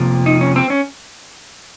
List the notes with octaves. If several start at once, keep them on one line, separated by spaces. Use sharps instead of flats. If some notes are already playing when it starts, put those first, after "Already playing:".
Already playing: F2 C3 F3 A#3
D#4
C#4
C4
C#4